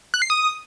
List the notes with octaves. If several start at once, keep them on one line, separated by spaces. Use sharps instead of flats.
F#6
C7
D#6